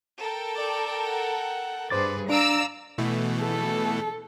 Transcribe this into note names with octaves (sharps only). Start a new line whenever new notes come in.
A4 A#4 G5
D5
F#5
G2 G#4 B4 C5 D6 A6
D4 D5 F5 A#5 E6 D7
B2 E3 A3
A4